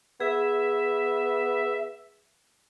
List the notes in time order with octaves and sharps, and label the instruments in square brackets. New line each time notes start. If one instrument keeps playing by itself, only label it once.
[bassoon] B3 [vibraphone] G#4 [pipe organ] E5